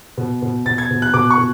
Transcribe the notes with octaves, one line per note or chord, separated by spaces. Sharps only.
B2
B2
B2 A6
G#6
B2
F#6
B2 D6
C#6
B2